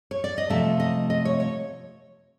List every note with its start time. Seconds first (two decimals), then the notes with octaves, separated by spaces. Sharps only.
0.11 C#5
0.24 D5
0.38 D#5
0.50 C3 F3 A3 E5
0.80 D#5
1.10 D#5
1.25 C#5
1.40 C#5